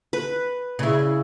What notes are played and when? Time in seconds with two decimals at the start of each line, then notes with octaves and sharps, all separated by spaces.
0.13 B4
0.79 C#3 E4